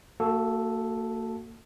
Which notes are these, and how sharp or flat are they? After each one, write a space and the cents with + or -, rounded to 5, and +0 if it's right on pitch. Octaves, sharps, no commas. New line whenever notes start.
A#3 -40 F#4 +0 A4 +0